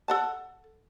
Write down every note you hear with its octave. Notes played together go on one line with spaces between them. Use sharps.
A4 F#5 A5